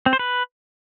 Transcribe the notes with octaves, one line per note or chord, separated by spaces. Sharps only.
C4
C5
B4